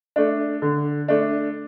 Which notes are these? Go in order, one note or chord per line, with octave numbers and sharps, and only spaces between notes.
A3 D4
D3
A3 D4